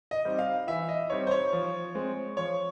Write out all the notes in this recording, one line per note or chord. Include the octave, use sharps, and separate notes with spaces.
D#5
G3 C4 D#4
F5
E3 E5
D#5
G3 C4 D#4 C#5
C5
C#5
F3
G#3 C4
F3 C#5